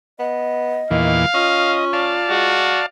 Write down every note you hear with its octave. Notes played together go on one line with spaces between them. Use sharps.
B3 D#5
E2 A#2 D#3 E3 F5
C#4 F4 D#5
D5 F5 A5
G#3 F#4